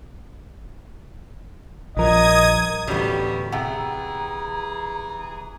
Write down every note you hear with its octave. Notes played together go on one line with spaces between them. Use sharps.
A#1 G2 F3 A#4 D#5 D#6 G#6
A1 D2 A2 F#3 G3 B3
C3 E3 G#4 F#5 G5 A#5